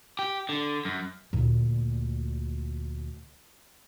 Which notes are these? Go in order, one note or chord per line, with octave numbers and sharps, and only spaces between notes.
G4
D3
F#2
D2 A#2